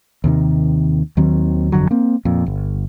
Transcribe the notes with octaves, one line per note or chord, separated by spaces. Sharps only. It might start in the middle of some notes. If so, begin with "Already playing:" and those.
D#2 C3 D#3
D#2 D#3 F#3 C4
G1 F2 D3 F#3
A#3 C4
F2 A#2
G1